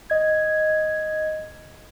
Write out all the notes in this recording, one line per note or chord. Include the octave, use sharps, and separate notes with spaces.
D#5 G#6